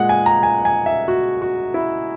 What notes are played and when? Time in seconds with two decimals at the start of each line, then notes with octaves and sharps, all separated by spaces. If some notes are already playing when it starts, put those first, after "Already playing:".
Already playing: A#2 G#3 F#5
0.09 G#5
0.26 A#5
0.43 G#5
0.65 G#5
0.86 E5
1.08 F#4
1.42 F#4
1.74 E4